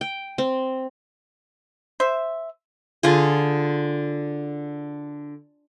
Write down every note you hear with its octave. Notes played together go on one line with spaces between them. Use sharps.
G5
C4
C5 E5
D3 F4 G#4